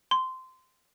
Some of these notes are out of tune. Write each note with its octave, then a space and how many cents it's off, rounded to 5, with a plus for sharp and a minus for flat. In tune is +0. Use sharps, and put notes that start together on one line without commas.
C6 -15